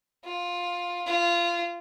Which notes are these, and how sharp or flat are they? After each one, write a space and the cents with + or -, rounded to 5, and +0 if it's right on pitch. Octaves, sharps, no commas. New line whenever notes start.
F4 +10
F4 -20